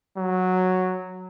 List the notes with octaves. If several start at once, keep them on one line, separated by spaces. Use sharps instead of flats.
F#3